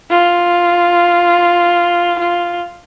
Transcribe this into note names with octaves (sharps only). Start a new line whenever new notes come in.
F4
F4